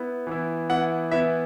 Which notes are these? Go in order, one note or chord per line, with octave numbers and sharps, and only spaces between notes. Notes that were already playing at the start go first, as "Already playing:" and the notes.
Already playing: B3 E4
E3 B3 E4
E3 B3 E4 F#5
E3 B3 E4 E5